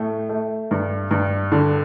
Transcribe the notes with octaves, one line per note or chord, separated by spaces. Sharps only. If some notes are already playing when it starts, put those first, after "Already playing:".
Already playing: A2 A3
A3
G2
G2
D3